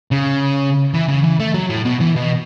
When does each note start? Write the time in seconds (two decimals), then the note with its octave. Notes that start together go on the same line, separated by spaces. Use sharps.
0.12 C#3
0.94 E3
1.08 C#3
1.24 E3
1.40 A3
1.54 F#3
1.70 A2
1.85 B2
2.01 E3
2.16 B2